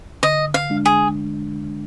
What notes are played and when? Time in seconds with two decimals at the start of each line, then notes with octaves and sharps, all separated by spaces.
0.23 D3 D#5
0.54 F5
0.70 G#3 D4
0.85 G#4